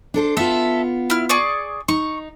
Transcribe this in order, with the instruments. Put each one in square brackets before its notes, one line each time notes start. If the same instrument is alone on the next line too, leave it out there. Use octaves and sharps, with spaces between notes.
[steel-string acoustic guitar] D4 A4 C5
[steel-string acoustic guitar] B3 F4 [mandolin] A4 E5
[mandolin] E4 F6
G#4 D5 C#6
[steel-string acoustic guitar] D#4 [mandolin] C#6